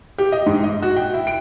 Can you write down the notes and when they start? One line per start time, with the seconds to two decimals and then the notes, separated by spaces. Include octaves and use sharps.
0.18 G4
0.32 D#5
0.46 G#2
0.64 D#5
0.82 F#4
0.97 G5
1.13 E4
1.27 D7